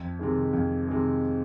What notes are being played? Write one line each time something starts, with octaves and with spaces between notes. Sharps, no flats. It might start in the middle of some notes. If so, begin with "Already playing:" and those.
Already playing: F2
C3 D#3 G#3
F2
C3 D#3 G#3